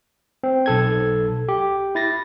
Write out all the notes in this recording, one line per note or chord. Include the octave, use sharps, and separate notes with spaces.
C4
B1 A4 G#6
G4
E4 A6 A#6